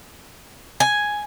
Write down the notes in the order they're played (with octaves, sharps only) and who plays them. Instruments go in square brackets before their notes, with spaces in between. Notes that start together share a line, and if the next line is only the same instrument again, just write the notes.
[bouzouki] G#5